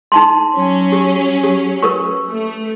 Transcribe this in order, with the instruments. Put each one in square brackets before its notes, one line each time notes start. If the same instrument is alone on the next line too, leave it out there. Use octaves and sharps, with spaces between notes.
[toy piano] D#4 A5 C6
[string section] F#3 C#4
[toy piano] G4
G4
A#4 B4 C#6
[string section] A3